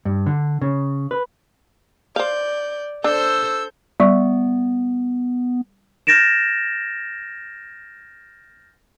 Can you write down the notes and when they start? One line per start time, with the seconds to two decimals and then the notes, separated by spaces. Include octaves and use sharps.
0.05 G2
0.26 D3
0.62 C#3
1.11 B4
2.16 C5 D5 F5 G6
3.04 D4 A4 C5 E6 G6
4.00 G3 B3 D5 C#6
6.07 F6 G6 A6 A#6 D7 E7